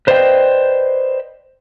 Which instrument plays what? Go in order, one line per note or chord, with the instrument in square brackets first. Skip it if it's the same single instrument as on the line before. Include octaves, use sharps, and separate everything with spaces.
[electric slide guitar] B4 C5 D5 D#5 F5 G5